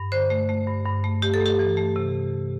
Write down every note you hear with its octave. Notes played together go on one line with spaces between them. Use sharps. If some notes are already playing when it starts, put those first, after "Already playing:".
Already playing: G2
D3 C5
A3
A3
G2
G2
A3
A3 G4
A4
A3 G4
E3
A3
C3